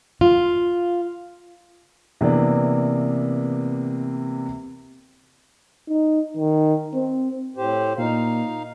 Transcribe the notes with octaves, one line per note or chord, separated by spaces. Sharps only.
F4
C3 E3 A#3 B3 D4
D#4
D#3
C4
A2 G4 C5
A#2 D#4 F5